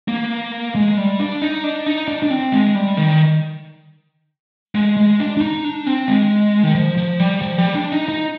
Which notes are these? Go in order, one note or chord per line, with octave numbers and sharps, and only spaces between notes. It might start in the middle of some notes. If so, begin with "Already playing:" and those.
A#3
G#3
G3
D4
D#4
D4
D#4
D4
D4
C4
G#3
G3
D#3
G#3
G#3
D4
D4
D#4
D4
C4
G#3
D#3
F3
F3
G3
F3
G3
D4
D#4
D#4